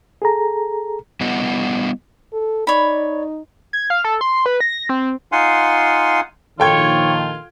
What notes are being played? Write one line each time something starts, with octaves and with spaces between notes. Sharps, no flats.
G#4 A4 A#5
G3 B3 E4 D#5 F#5
A4
D#4 C#5 D5 B5
G#6
F5
A4
C6
B4
A#6
C4
D#4 F4 F5 F#5 G#5 C6
A#1 D#3 F4 A4 C#5 G5 G#6